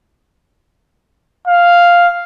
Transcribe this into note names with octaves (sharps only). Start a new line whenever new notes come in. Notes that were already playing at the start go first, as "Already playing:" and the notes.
F5